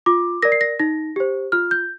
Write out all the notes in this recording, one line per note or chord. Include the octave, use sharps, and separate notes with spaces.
F4 D6
A#4 D5 A#6
C7
A#6
D#4 A#6
G4 C5
F4 F6
G6